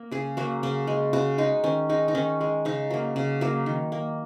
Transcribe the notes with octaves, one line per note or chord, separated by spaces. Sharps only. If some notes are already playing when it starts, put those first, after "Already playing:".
Already playing: A#3
C#3 G#4
F#3 A#3 F#4
C#3 C#4
G#3
C#3 F#4
G#3 D#4
D#3 C#4
G#3 D#4
D#4
D#3 C#4
G#3
C#3 D#4
F#3 A#3
C#3
F#3 A#3
D#3
A#3